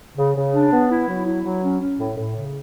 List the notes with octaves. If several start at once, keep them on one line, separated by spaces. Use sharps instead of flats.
C#3
C#3
D4
B3
E4
F#3
E4
F#3
C#4
C#4
A2
A2
C#3